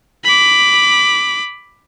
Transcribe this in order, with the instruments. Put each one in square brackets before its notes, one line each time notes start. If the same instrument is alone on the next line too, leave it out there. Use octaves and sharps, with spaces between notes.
[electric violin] B5 D6